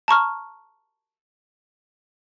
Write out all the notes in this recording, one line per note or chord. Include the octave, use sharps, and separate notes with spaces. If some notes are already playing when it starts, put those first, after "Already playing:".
A5 A#5 C#6 F6